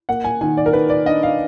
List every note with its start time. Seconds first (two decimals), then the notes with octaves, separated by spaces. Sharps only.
0.09 A#3 F#5
0.24 G#5
0.41 D#3 G#5
0.57 D5
0.66 A#4
0.73 D#3 B4
0.90 D5
1.06 D4 D#5
1.23 F5